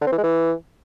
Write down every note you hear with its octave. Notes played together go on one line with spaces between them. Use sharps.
D3
C4
E3
G#3
E3